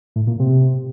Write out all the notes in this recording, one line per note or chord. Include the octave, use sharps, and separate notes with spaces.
A2
A#2
C3